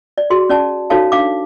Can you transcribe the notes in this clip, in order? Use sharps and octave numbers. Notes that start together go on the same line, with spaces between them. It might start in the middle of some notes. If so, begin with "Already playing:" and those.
D5
F#4 G#4 C6
C#4 D5 A5
D#4 F#4 A4 C#5 F5 A5
D4 F5 D6